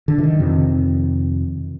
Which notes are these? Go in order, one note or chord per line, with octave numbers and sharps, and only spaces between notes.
D3
E3
D#3
F2 C3